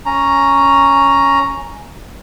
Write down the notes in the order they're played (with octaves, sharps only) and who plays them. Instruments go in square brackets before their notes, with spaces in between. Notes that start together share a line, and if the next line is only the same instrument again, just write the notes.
[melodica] C#4 A#5